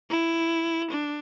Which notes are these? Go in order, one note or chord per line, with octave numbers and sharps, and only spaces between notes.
E4
D4